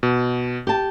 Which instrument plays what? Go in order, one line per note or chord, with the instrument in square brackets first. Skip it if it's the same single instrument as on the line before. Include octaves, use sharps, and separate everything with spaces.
[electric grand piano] B2
[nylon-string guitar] G4 A5